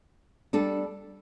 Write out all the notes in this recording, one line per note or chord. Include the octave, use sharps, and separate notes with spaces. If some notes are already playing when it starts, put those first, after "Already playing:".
G3 D4 A4